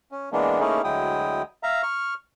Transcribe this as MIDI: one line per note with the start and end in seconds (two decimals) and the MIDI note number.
0.12 0.29 61
0.32 0.60 52
0.32 0.60 56
0.32 0.60 58
0.32 0.60 59
0.32 0.60 62
0.60 0.82 57
0.60 0.82 58
0.60 0.82 61
0.60 0.82 63
0.60 0.82 64
0.60 0.82 68
0.84 1.42 38
0.84 1.42 54
0.84 1.42 56
0.84 1.42 64
0.84 1.42 79
0.84 1.42 87
1.63 1.82 76
1.63 1.82 77
1.63 1.82 82
1.83 2.14 85
1.83 2.14 89